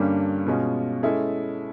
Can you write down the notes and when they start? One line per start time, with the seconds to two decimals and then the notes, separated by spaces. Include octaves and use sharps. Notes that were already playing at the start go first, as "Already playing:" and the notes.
Already playing: G2 D3 G3 A#3 C#4
0.46 B2 G#3 C#4 F4
1.03 G#3 C#4 E4 A4